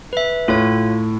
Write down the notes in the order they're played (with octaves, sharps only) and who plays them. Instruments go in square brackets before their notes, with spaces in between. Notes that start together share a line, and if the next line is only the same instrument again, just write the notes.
[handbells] B4 E5
[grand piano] A2 [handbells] F4 C#5